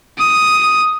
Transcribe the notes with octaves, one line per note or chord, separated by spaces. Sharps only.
D#6